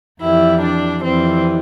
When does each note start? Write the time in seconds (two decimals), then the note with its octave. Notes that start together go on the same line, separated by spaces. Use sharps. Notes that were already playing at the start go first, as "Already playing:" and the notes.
0.21 F2 E3 G3 E4
0.61 D4
1.03 F2 E3 G3 C4